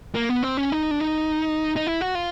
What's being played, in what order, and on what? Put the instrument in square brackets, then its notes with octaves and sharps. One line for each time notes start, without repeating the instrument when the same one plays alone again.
[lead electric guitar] A#3
B3
C4
C#4
D#4
D4
D#4
D#4
E4
F#4
F4